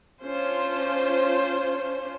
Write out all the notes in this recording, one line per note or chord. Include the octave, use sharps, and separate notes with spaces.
C#4 D4 F4 C5